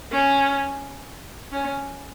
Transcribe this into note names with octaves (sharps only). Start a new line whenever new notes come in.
C#4
C#4